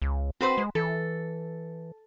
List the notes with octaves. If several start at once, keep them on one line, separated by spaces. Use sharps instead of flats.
C#2
C4 F#4 B4 C5
G#3
E3 A4